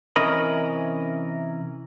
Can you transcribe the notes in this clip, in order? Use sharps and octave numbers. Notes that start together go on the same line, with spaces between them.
C3 E3 C#4 A#4 D#5 B5